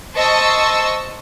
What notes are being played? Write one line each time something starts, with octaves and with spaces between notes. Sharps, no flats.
C5 D#5 A5 C#6 E6